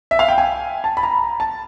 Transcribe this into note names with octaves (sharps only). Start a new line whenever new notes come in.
E5
F5
G5
G#5
A5
B5
A#5
A5